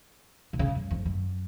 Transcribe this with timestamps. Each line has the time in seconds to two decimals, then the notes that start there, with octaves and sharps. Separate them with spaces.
0.53 B2
0.59 C#3
0.75 F#2
0.90 F2
1.05 F#2